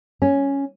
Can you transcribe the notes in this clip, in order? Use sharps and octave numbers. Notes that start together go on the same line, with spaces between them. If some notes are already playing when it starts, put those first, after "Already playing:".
C#4